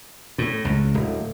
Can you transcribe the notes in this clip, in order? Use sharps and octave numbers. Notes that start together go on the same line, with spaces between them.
A2
C#2
D1